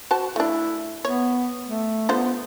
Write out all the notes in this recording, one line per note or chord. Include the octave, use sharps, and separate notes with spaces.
F#4 C5 A5
A3 D4 E4
B3 C#5
A3
D3 B3 F4 C5